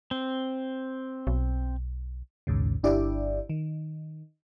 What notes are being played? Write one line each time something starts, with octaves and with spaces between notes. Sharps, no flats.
C4
B1
A#1 D#2 G#2 C#3
G1 D4 E4 G4 D5
D#3